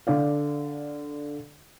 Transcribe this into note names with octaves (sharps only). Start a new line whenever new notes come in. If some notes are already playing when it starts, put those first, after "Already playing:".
D3 D5 F5